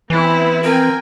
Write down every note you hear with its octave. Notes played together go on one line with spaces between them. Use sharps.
E3 B3 C4 E4
F3 C4 A#4 G5 G#5